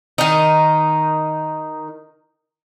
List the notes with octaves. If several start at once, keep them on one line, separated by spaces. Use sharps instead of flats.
D#3 D#4